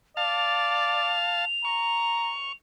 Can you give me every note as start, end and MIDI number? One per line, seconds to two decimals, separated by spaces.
0.17 1.19 74
0.17 1.45 77
0.17 1.45 81
0.17 2.53 101
1.65 2.33 82
1.65 2.52 85